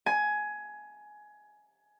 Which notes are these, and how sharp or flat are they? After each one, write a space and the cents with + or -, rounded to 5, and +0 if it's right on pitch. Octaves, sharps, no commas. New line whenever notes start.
G#5 +15